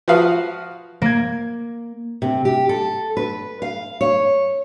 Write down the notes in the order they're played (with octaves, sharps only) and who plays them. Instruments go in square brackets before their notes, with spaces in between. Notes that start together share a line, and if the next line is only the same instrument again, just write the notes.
[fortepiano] F3 F#4 B4 F5 D#6
[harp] A#3 G#6
[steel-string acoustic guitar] C3
G4
A4
B4
F5
C#5